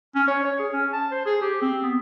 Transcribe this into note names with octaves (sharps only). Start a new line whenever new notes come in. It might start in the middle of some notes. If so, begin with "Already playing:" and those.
C#4
C#5
C#5
G#4
C#4
A5
C5
G#4
G4
C4
B3